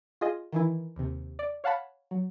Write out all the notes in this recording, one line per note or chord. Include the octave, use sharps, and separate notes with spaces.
F4 G#4 D#5
D#3 E3 E4
D#2 C3
D5
C#5 F5 F#5 A5 B5
F#3